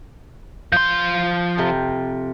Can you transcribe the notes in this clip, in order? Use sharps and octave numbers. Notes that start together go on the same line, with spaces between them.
F3 C6 G6
F2 C3 F4